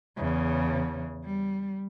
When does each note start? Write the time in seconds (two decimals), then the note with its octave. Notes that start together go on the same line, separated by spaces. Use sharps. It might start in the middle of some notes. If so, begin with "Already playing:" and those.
0.17 E2 C#3
1.25 G3